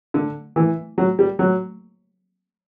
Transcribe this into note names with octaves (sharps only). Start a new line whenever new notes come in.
D3
E3
F#3
G3
F#3